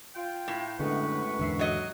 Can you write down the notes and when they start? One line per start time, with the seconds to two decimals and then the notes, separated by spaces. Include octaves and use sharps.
0.15 F4 G5
0.48 A2
0.79 F#2 D3 G#3 A3 B3 B4 C#6
1.39 E2 G#2 D3 F#4 E5 C7
1.59 F#3 D#5